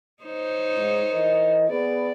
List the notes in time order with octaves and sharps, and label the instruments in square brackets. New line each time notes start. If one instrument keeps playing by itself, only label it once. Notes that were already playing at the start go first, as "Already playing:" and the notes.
[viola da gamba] D#4 C5 C#5
[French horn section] G#2
E3 A#4 D#5
[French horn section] B3 G#4 B4 [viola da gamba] D5